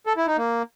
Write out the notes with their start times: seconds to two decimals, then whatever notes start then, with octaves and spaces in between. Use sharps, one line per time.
0.07 A4
0.17 E4
0.27 D#4
0.38 A#3